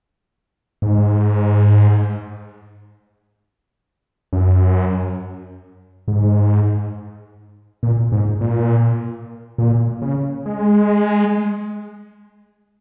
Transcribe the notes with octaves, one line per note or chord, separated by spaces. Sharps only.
G#2
F#2
G#2
A#2
G#2
A#2
A#2
C#3
G#3